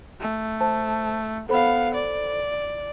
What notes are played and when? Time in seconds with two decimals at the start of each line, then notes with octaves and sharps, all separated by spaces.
0.20 A3
0.61 C5 A5
1.49 B3 A4 C5 F5 B5
1.95 D5